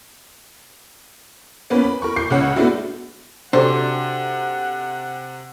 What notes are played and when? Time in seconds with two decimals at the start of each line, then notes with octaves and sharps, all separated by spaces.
1.70 A#3 B3 C#4 B4
1.84 B5
2.02 A#4 B5 C#6
2.16 C#6 D6 G6 C7
2.30 C#2 C#3 C#5 F#5
2.56 G#3 A3 B3 D4 E4 F#4
3.53 C3 D4 F#4 A4 C5 F#5